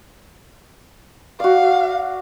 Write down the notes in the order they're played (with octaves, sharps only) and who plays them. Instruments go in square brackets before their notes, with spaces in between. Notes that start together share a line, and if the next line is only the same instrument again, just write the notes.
[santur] F#4 D5 [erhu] F5